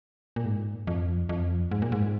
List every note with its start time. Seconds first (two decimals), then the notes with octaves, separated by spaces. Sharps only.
0.36 A#2
0.45 G#2
0.87 F2
1.29 F2
1.71 G#2
1.82 A#2
1.92 G#2